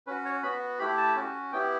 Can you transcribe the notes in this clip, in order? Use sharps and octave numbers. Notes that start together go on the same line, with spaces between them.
C#4 F#4 B4
C#5
B3 F#4 B5
A3 E4 G4 B5
A5
C#4 F#4
B3 E4 G4 G5